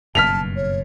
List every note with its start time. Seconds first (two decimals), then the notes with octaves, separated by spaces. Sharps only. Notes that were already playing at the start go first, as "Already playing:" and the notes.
0.15 F#1 G2 B2 A5 F6 B6 F7
0.56 C#5